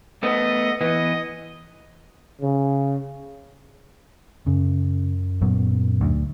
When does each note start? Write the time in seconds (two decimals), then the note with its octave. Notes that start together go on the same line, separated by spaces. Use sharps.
0.23 A3 B3 D#5
0.81 E3 B3 D#5
2.41 C#3
4.47 F#2 C#3
5.41 A#2 F#3 B3
6.01 D2